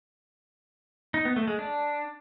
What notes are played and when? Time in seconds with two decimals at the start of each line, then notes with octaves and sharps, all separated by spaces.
1.14 D#4
1.25 B3
1.36 A3
1.48 G#3
1.59 D4